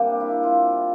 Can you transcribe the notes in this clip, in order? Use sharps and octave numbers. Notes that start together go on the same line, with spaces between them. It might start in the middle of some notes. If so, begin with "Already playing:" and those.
Already playing: C3 G3 A#3 D4 G4
E4
F4